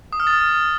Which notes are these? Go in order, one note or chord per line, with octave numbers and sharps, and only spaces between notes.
D#6
F6
A6